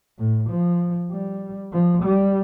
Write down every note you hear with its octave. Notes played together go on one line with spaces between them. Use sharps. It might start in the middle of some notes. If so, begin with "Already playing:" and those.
A2
F3
G3
F3
G3